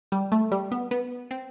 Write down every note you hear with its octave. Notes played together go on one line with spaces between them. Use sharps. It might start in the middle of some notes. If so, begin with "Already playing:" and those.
G3
A3
G3
B3
B3
C4